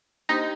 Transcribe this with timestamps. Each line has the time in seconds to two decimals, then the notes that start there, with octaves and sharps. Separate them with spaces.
0.29 A#3 D4 D#4 G4 C5